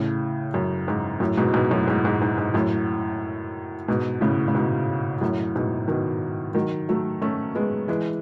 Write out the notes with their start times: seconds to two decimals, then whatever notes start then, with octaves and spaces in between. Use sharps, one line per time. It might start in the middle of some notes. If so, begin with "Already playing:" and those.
Already playing: A2 C#3
0.54 F#2
0.88 G#2
1.20 F#2 A2
1.37 G#2 B2
1.54 G#2 B2
1.71 F#2 A2
1.88 G#2
2.05 G#2
2.22 G#2
2.38 G#2
2.54 F#2 A2
3.88 G#2 B2
4.21 A2 C#3
4.48 C#3
4.55 G#2 B2
5.21 F#2 A2
5.56 G#2 B2
5.88 B2 D#3
6.55 D#3 F#3
6.89 F#3 A3
7.21 A3 C#4
7.55 G#3 B3
7.88 E3 G#3